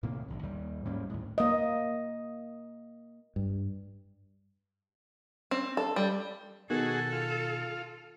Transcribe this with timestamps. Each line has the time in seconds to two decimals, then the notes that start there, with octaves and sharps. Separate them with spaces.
0.03 A2 C3 D#3 A#3
0.28 A#1 D#2
0.43 D#2 G3
0.85 G#2 G3 A#3 C#4
1.09 D#2 A2
1.38 A#3 D#5
3.36 G2
5.51 C4
5.77 A4
5.96 G3
6.70 B2 D#3 F#4 G#4 A4
7.13 F4